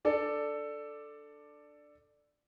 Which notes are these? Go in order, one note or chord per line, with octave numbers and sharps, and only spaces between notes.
D4 A4 D5